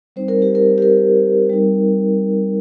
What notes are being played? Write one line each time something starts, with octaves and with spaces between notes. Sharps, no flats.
G3 C4 D#4 C5
A#4
G4
A#4
G4
A#4
G3 C4 D#4